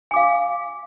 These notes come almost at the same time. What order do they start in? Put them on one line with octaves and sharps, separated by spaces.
G#5 D6 F5